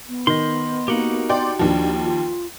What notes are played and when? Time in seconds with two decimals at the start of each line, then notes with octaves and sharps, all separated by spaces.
0.08 B3
0.27 D#3 D#5 C6
0.88 A#3 D#4 F#4 G4
1.29 D5 G5 C6
1.59 D#2 F3 D4
2.04 F4